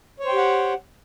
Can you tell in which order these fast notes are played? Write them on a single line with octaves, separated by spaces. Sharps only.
C#5 C5 G5 G4 F#5